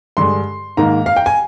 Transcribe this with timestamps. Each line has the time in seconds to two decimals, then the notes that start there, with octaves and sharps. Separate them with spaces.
0.17 G2 D3 G#3 C6
0.77 G#2 D#3 A#3 A#5
1.06 F5
1.16 G5
1.26 G#5